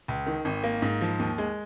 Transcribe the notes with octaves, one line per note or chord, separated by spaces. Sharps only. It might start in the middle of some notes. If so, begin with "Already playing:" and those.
C#2
D#3
G#1
A#3
G#2
F3
D#2
G#3